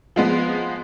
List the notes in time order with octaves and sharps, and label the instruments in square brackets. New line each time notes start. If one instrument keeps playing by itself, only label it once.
[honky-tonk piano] F3 G#3 B3